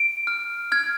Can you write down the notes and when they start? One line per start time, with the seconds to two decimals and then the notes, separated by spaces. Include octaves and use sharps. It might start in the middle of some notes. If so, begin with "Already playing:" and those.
Already playing: D7
0.27 F6
0.72 F6 G#6